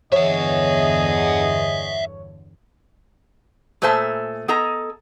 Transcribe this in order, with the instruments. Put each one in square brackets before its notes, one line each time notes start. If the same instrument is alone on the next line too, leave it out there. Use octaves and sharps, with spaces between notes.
[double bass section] E2 G2 D3 [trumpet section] G#4 D#5 [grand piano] C#5 [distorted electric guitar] E5 F#5
[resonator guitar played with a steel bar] A#2 A3 G#4 C5 E5 A5
B3 G#4 A4 D#5 A#5